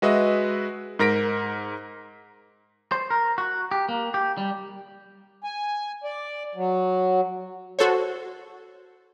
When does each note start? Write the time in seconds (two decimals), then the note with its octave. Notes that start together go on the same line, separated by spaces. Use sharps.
0.02 G#3 F#4 B4 D#5 E5
0.99 G#2 A#4 A#6 B6 D7
2.92 C5
3.11 A#4
3.38 F#4
3.71 G4
3.89 A#3
4.14 G4
4.37 G3
5.44 G#5
6.04 D5
6.55 F#3
7.79 F#4 A4 C5 C#5